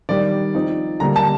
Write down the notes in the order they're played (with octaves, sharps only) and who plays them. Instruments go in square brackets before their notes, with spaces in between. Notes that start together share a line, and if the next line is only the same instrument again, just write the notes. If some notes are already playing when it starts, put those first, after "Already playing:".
[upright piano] D#3 G3 D4 D5
F3 C4 D#4
D3 G3 A#3 A#5
A5